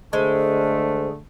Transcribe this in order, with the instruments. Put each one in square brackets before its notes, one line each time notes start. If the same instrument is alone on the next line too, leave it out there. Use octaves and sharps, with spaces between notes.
[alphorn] D3 [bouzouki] G#3 [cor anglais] A3 [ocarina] C5